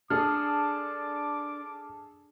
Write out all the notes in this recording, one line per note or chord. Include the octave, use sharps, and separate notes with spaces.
D4 G#4 A4 D6 D#6 F6